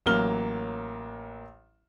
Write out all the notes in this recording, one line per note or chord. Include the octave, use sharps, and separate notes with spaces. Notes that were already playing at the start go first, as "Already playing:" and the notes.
A1 F#3 A#3 F6 G7